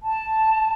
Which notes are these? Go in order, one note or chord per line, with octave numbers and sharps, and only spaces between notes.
A5